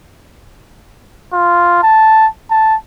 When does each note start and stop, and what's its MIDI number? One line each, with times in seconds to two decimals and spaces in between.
1.33 1.80 65
1.83 2.27 81
2.50 2.75 81